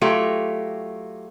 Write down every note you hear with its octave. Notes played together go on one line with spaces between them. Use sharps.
F#3 A3 F4 G4